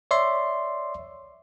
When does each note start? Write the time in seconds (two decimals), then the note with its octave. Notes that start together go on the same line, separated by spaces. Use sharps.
0.11 C#5 D5 E5 C6